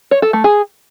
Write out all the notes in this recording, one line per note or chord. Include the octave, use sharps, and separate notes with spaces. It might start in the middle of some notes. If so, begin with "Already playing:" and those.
C#5
A4
A3
G#4